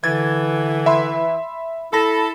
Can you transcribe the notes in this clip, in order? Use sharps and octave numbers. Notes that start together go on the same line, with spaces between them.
D3 E3 G#6 A6
E5 B5 C6
E4 A4 A5 B5 A#6